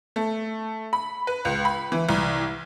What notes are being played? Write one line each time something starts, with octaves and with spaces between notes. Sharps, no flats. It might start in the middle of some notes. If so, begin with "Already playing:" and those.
A3
B5
B4
C#2
B5
E3
C2